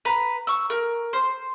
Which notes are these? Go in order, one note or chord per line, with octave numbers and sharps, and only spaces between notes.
B4 A#5
C#6 E6
A#4
C5